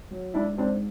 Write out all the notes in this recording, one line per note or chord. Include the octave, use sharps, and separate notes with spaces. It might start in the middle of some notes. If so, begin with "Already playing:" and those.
F#3
G#2 D4 E4
G#2 C4 D4